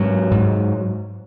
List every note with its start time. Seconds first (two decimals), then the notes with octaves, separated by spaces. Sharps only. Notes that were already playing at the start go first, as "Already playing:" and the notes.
Already playing: G#2 F#3
0.31 G#2